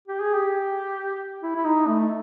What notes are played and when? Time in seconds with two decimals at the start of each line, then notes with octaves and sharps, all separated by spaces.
0.08 G4
0.20 G#4
0.35 G4
1.43 E4
1.56 E4
1.65 D#4
1.88 A3